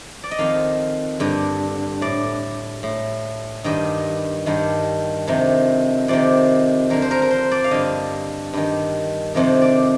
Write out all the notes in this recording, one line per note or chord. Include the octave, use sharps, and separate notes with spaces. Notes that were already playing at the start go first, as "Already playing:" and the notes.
D5
D#5
F2 D#3 F5
G2 D3
A2 D5
A2
G2 D#3 D#5
G2 D#3
F2 C3 D#3
F2 C3 D#3 D5
F2 D3 A#4
C5
A#4
A#4
C5
D5
F5
G2 D3 D#5
G2 D#3
F2 C3 D#3
D5